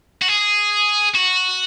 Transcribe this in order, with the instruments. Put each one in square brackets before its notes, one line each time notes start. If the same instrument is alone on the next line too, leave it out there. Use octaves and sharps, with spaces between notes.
[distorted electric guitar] F#4
G#4
F#4